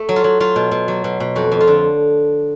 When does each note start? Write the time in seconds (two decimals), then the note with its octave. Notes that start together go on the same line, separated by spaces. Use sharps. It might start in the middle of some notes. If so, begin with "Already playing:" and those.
Already playing: A3
0.09 F#3
0.16 F4
0.24 F#3
0.40 F#3 F4
0.56 B2
0.71 B2
0.88 F#3
1.04 B2
1.20 B2
1.35 F2 F#4
1.52 F2
1.61 F4
1.67 D3